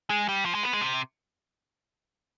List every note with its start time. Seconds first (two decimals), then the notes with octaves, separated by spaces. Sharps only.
0.10 G#3
0.29 G3
0.45 F3
0.55 G#3
0.63 B3
0.73 G#3
0.81 C3